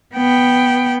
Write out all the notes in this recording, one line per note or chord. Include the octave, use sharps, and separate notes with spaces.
B3 G5